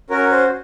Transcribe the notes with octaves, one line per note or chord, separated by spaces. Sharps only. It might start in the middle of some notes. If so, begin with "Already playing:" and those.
C#4 F#4 A#4
C5